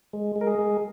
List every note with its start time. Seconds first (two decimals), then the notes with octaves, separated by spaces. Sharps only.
0.13 G#3
0.36 G#3
0.41 A#4
0.47 G#4
0.59 G#3